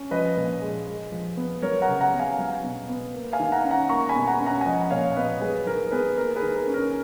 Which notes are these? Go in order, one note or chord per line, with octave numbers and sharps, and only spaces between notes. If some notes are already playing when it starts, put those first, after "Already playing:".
Already playing: C#4
F3 B4 D#5
A#2
G#3
G#3
F3
B3
F#3 A#4 C#5
F#5 A#5
C#3
F#5 A#5
B3
F5 G#5
F#3
B2
B3
A#3
F5 G#5
D#3
F#5 A#5
C#4
F#5 A#5
A#3 A#5 C#6
G#5 B5
B2
F#5 A#5
C#4
F#5 A#5
G#5
F3 D#5 F#5
A#2 C#5 F5
B3 B4 D#5
F#3 G#4 B4
D#3 A#4
B3 G#4 B4
A#3 A#4
G#4 B4
D#3
A#4
C#4
A#4